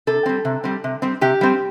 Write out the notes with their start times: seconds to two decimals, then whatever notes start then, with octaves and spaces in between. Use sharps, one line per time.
0.07 C3 A4
0.26 G3 C4
0.45 C3
0.64 G3 C4
0.84 C3
1.02 G3 C4
1.21 C3 G4
1.41 G3 C4